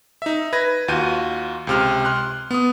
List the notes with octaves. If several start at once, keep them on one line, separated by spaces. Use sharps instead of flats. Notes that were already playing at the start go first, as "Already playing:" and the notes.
D#4 E5
B4 G#6 A#6
D#2 F4 F#4 G6 D#7
C#2 C3 F6
C6 F6 F#6
B3 D#6